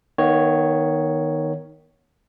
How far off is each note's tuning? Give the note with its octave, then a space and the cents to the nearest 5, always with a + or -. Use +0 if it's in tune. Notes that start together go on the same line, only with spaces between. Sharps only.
D#3 +0 B3 -35 C#5 +0